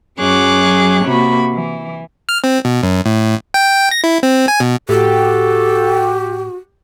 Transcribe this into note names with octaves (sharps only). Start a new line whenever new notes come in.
F#2 F#3 G#4 C#5 D6 F#6
C3 A#3 F#4 B5
E3
F6
C4
B2
F#2
A2
G5
A#6
E4
C4
G#5
B2
A2 F#4 G4 A4